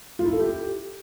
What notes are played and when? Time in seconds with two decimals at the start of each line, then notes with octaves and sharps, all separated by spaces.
0.19 F4
0.26 E4
0.33 A4
0.39 G4